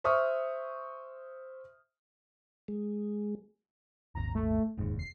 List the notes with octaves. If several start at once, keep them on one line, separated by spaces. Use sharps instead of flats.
C5 E5 C#6 D#6 F6
G#3
D#1 G#1 D#2 A#5
A3
F1 D#2 G#2
C7